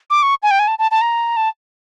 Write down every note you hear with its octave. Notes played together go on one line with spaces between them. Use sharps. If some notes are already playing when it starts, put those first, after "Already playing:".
D6
C#6
G#5
G5
G#5
A5
A5
A5
A#5
A5